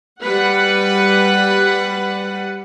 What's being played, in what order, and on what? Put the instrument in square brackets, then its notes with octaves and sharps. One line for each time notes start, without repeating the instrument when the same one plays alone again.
[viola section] G3 B4 F#5